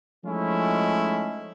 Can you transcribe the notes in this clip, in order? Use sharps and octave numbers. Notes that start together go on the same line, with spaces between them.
F3 G#3 A3 C#4 D#4 E4